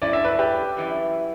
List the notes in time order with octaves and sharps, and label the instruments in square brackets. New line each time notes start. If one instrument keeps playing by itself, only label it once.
[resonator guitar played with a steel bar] G2 F#3 A3 C#4 E4 [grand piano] D5
[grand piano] E5
B4 D5
G4 B4
[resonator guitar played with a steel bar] F#2 E3 G3